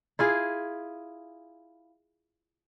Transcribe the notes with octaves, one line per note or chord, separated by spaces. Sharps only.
E4 F4 G#4